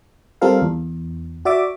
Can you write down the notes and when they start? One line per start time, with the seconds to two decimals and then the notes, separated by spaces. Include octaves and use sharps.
0.41 G3 C4 F4 A4 A#4 F5
0.62 E2
1.45 F#4 D5 E5 D6